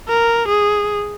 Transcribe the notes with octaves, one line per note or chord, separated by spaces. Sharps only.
A#4
G#4